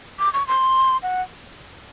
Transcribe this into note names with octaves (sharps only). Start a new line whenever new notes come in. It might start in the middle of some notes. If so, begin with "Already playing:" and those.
D6
C#6
C6
F#5